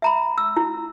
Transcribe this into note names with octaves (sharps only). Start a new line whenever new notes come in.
E5 A#5 B5
E6
E4